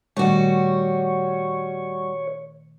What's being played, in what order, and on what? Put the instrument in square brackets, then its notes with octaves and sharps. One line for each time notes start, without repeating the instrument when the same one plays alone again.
[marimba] A#2 D#3 A3 [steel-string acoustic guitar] G3 F#4 [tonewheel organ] C#5